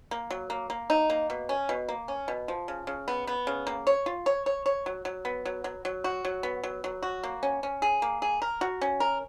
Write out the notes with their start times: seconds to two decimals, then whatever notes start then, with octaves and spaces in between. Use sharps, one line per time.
0.11 A#3
0.30 F#3
0.50 A#3
0.70 A#3
0.90 D#4
1.10 A#3
1.30 B2
1.49 C#4
1.69 B2
1.89 A#3
2.08 C#4
2.28 B2
2.48 F3
2.68 C#3
2.87 C#3
3.08 B3
3.27 B3
3.47 C#3
3.67 A#3
3.87 C#5
4.06 F4
4.26 C#5
4.46 C#5
4.66 C#5
4.86 F#3
5.05 F#3
5.25 B3
5.45 F#3
5.64 F#3
5.85 F#3
6.04 F#4
6.25 F#3
6.43 B3
6.63 F#3
6.84 F#3
7.03 F#4
7.23 A#3
7.43 C#4
7.63 C#4
7.82 G#4
8.02 A#3
8.22 G#4
8.42 A#4
8.61 F#4
8.81 C#4
9.00 A#4